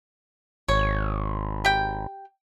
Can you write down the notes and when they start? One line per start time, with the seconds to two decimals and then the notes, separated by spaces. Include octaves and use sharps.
0.68 G#1 C#5
1.65 G4 G5